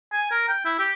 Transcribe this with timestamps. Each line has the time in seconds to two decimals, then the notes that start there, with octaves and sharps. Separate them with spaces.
0.12 G#5
0.31 A#4
0.48 G5
0.65 E4
0.79 G4